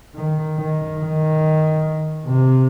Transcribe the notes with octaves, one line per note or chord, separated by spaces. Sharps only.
D#3
D#3
D#3
C3